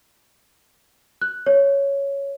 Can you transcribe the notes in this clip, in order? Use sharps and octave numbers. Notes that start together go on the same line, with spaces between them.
F#6
C#5